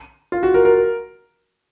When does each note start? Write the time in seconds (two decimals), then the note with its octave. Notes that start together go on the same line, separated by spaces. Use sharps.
0.32 F4
0.43 F#4
0.54 A#4
0.65 A#4